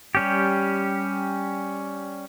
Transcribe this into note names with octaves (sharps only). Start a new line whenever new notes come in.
G3 C#4 G4